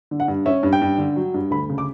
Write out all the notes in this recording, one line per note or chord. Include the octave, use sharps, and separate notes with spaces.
D3
F#5
G2
C#4 E5
G2
G5
G2
D3
F#3
G2
D2 B5
C#3
D6